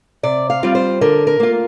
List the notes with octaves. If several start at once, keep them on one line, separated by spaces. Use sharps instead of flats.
C3 D5
F5
G3 C4 F4
C5
D3 A#4
A#4
A#3 F4